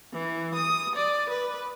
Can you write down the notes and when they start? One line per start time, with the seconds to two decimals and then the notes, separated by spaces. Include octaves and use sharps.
0.13 E3
0.54 D#6
0.95 D5
1.28 B4